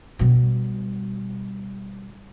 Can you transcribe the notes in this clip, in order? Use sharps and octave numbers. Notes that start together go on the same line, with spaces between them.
B2 G3